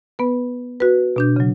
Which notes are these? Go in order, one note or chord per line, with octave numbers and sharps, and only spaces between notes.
B3 B4
F#4 B4
B2 D4 G6
C#3 F#3